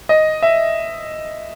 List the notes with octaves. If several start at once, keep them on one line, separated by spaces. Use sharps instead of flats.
D#5
E5